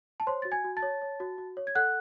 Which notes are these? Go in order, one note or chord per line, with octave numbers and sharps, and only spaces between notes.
A5
C5 C#5 C6
F#4 A6
G#5 G#6
F#4
A5 A6
C#5
C#5
F#4
F#4
C#5
G#6
A4 F#5 F#6